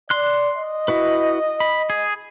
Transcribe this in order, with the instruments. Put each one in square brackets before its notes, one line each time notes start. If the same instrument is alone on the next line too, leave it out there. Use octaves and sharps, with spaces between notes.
[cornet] D5 [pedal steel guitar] C6 F#6
[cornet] D#5
[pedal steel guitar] E4 F#4 B4
B5
G#4